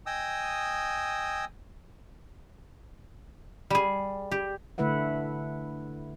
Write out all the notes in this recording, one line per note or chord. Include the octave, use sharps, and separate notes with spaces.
D#5 G5 G#5 D#6 E6
G3 G#4
G4
D3 A3 E4 B4 E5 F#5